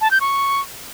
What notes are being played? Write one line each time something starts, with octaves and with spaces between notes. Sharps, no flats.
A5
G6
C#6